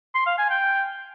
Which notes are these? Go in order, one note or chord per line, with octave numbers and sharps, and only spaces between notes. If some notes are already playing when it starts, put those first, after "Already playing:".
C6
F5
G#5
G5